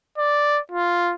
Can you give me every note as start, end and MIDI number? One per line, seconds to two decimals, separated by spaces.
0.18 0.60 74
0.72 1.14 65